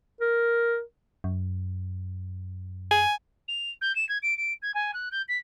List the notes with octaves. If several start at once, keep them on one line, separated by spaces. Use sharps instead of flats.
A#4
F#2
G#5
F7
G6
E7
G#6
D7
D7
G#6
G#5
F#6
G6
B6